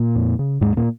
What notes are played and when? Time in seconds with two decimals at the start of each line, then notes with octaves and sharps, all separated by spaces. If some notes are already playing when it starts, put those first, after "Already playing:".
Already playing: A#2 A#3
0.16 F2
0.39 C#3
0.61 D#2 G#2 G#3
0.77 A#2 A#3